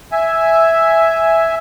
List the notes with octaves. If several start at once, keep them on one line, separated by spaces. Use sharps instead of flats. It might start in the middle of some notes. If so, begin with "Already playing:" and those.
E5 G#5